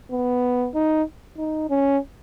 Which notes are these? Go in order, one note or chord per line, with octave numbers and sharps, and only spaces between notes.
B3
D#4
D#4
C#4